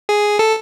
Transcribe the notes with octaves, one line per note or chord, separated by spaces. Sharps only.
G#4
A4